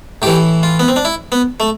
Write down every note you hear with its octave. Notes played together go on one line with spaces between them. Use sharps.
A2 E3 G4
F4
B3
C4
D4
E4
B3
A3